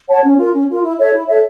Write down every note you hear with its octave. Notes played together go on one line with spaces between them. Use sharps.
C#5 F#5 A5
C#4
F4 A#4
C#4
F4 A#4
E4
A4 C#5 E5
E4
A4 C#5 E5